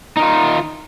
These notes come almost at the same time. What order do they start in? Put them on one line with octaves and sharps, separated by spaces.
D#4 D#3 F4